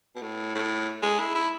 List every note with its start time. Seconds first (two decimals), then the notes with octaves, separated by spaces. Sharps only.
0.16 B2
0.22 A2
0.55 A2
1.02 G#3
1.20 E4
1.35 E4